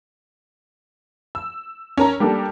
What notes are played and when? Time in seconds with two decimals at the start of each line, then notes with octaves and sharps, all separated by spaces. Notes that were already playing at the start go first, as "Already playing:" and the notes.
1.35 E6
1.97 C#4 A#4 A#5
2.20 G3 A#3 D4 G4 A4